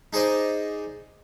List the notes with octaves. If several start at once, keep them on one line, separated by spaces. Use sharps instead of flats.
D#4 G#4 C5 D5 D#5